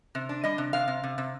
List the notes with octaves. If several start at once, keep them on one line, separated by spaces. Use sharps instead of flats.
C3
D4
G3 D#5
C3
C3 F5
C3
C3
C3